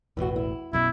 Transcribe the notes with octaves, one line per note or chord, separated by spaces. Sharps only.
E1 A1 A2 E3 F#4
E4
B1 F#2 B2 E4